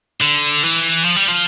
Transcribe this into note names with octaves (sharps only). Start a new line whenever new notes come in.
D3
E3
F3
G3
F3